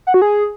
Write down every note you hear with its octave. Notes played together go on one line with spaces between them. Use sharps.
F#5
F#4
G#4